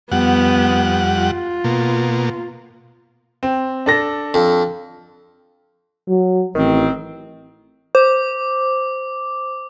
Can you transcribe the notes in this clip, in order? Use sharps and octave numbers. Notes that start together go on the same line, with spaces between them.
F2 G3 B3 F#5
F4
B2 A#3
C4
D4 A4 A#6
F2
F#3
A1 D#3 C4
C5 D6